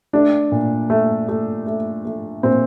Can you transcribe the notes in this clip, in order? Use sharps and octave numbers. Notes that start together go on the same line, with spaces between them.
A3 D4
A#2
A3
A3
A3
A3
A#2 C4